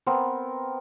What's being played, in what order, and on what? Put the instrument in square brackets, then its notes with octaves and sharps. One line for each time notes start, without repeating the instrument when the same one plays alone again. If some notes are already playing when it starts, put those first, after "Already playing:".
[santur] B3 C4 A#4